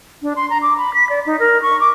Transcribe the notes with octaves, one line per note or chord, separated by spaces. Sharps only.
D4
C6
A#5
D6
B5
B6
D5
D#4
A#4
C#6
D6